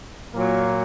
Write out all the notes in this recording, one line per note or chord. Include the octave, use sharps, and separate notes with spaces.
A#2 F#3 A#3